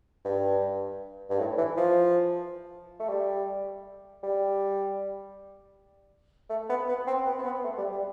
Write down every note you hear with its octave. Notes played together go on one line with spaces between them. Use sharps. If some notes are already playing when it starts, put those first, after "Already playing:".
G2
G2
A2
E3
F3
A3
G3
G3
A3
B3
B3
C4
B3
C4
B3
A3
G3
G3